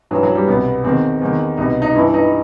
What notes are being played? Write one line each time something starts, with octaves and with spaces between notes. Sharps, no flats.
G2 E3 F#3
F#3
G3
C2 B2 B3
E2 D#3 C4
E2 D#3
C2 B2 D#4
D#4
G2 E3 E4
D#4